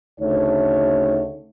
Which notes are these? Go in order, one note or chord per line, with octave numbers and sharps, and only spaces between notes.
D2 C#3 A3 D#4 C#5